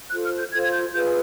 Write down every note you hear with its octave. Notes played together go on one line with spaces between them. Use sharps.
F4 A4 C5 F#6
F6
G6
F4 A4 C5 G#6
G#6
G6
F4 G#4 B4 G6